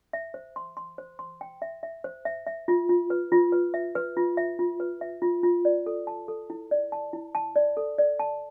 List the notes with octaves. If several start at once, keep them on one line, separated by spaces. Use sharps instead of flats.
E5
C5
C6
C6
C5
C6
G5
E5
E5
C5
E5
E5
F4
F4
B4
F4
B4
E5
B4
F4
E5
F4
B4
E5
F4
F4
D5
A4
A5
A4
E4
D5
A5
E4
A5
D5
A4
D5
A5